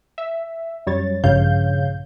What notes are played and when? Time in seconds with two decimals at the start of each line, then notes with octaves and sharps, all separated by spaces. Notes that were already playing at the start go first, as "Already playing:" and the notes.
0.18 E5
0.87 F#2 G3 C#5 A6
1.24 A#1 G2 C#3 C#5 F5 G6